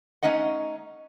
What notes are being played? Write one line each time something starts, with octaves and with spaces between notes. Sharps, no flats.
A3 C#4 D#4 D#5 F#5